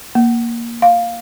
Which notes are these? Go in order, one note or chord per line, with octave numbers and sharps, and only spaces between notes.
A#3
F5